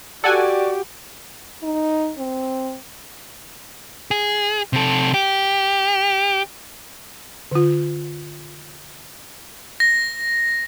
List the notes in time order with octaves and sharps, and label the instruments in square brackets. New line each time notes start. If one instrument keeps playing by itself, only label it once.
[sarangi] F#4 [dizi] G4 [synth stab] A4 F#5 G#5 [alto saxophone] D5
[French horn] D#4
C4
[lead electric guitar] G#4
C3 A4
G4
[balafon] D3 F4
[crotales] A#6